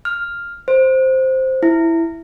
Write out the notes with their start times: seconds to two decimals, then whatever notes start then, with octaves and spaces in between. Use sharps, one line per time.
0.05 F6
0.68 C5
1.63 E4